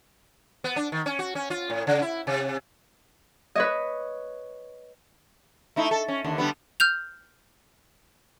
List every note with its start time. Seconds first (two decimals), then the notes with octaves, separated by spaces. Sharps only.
0.64 B3
0.76 D4
0.92 D#3
1.06 C#4
1.19 F#4
1.35 C#4
1.50 F4
1.70 A2
1.87 C#3
2.02 E4
2.27 C3
3.55 B4 C#5 D#5
5.76 A3 D#4 E4
5.91 A4
6.08 C#4
6.24 D#2 D3
6.38 D3 G3 B3
6.80 F6 G6 F7